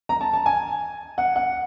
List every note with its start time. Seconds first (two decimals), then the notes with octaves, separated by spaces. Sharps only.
0.09 A#5
0.21 A5
0.33 A5
0.46 G#5
1.18 F#5
1.36 F#5